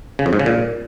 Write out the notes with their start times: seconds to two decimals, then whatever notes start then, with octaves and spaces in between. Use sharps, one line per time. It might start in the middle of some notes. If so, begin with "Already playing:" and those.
0.19 C#3
0.26 F2
0.33 G#2
0.39 C#3
0.46 A#2